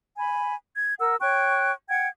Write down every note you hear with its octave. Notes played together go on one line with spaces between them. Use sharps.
G#5 B5
G#6
A#4 F#5 E6
C#5 G5 C#6 F#6
F#5 G5 G#6